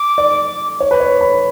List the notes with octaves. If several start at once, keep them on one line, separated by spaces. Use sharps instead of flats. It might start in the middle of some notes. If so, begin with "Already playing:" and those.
Already playing: D6
D5
C#5
B4
C#5
B5